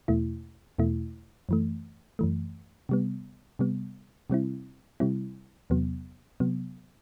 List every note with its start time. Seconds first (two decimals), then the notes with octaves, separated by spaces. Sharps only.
0.08 E2 B2 A3 E4
0.78 E2 B2 A3 E4
1.49 F#2 E3 A3
2.19 F#2 E3 A3
2.89 C3 G3 B3
3.59 C3 G3 B3
4.30 C3 G3 C4 E4
5.00 C3 G3 C4 E4
5.70 E2 C3 F#3 B3
6.40 C3 F#3 B3